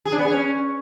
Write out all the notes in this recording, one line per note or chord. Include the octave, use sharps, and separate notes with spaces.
G#4
D4
B3
G#4
C#4